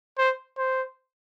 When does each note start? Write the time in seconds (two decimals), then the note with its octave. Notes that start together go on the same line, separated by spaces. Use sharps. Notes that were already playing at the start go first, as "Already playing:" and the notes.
0.18 C5
0.58 C5